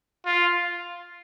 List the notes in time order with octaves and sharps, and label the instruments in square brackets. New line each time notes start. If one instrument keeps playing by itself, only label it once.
[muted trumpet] F4